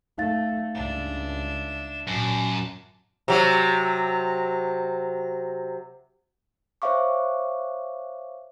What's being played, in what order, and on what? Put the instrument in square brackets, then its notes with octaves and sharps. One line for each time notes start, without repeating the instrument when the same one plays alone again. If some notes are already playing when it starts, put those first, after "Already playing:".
[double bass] A3 [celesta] D#4 F5 A6
[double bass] C#2 G2 [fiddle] D4 E5
[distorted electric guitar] F#2 [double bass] A#2 [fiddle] A5 D6
[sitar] C3 F#3
[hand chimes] C5 C#5 E5 F5 C#6 D6